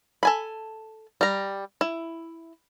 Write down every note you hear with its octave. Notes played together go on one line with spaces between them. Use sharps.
A4 G#5 B5
G3 A#5
E4